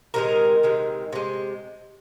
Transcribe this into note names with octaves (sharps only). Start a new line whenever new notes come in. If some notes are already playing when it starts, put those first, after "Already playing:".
C3 D#3 G#3 A#4
C3 D#3 G#3
C3 G#3